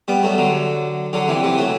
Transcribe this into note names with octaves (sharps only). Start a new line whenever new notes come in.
G3 B3
F#3 A3
D3 F#3
D3 F#3
C3 E3
C3 E3
F#3 A3